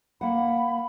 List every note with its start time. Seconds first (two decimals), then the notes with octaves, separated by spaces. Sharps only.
0.21 A#3 F#5 B5